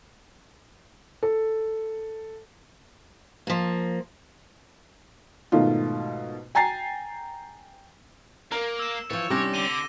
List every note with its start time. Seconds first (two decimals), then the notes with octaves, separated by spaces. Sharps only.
1.23 A4
3.47 F3 A#3
5.52 G#2 B2 D#3 A3 F4
6.55 G5 G#5 A#5 A6 C7
8.52 A#3 A#4
8.79 E6 E7
9.10 E3 F3 C#5 A6
9.30 C3 G3 C#4 D4 D6 E6 A#6
9.54 D3 D#7 G7